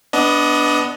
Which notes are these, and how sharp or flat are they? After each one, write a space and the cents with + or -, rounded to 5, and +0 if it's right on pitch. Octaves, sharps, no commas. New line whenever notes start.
B3 +0 D4 -5 D#5 +25